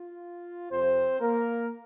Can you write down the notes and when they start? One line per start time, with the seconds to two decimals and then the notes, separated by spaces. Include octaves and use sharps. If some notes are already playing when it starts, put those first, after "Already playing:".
Already playing: F4
0.71 F2 C3 F3 C4 C5
1.20 A#3 A#4